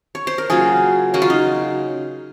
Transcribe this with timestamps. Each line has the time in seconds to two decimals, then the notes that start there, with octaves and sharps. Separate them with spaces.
0.15 C#5
0.27 C5
0.38 A#4
0.50 C#3 F#3 A#3 F4 G#4
1.14 C#3 F#3 A#3 F#4
1.22 F4
1.30 D#4